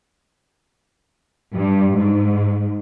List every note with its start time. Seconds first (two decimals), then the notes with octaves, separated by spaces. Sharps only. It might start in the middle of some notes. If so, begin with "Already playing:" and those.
1.53 G2
1.96 G#2